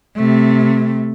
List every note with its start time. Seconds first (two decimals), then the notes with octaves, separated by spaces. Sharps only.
0.16 C3 A3